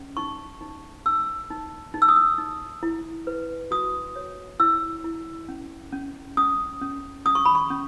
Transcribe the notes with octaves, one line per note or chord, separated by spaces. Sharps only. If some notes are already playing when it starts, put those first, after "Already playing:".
Already playing: C#4
D#4 C#6
D#4
D#4 E6
D#4
D#4
E6
D#6
E6
D#4
E4
B4
F#4 D#6
C#5
E4 E6
E4
C#4
C#4
C#4 D#6
C#4
C#4 D#6
C#6
B5
C#6
C#4